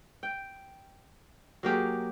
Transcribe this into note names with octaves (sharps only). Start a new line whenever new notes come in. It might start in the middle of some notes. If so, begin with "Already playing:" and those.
G5
F#3 A#3 G4 G#4